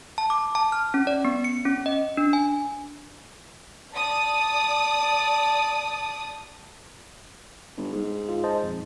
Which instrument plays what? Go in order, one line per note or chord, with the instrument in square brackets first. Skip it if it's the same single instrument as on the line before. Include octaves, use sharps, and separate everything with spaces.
[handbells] A5
D6
A5
F6
C#4
D5
B3
C#7
C#4
D#5
D4
G#5
[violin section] D5 D#6 [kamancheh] A5
[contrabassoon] G1
G#2
[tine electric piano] G1 F4
C5 D#5 A5
A#1 F2